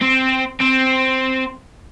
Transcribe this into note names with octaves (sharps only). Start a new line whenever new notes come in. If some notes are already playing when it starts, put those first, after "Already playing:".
C4
C4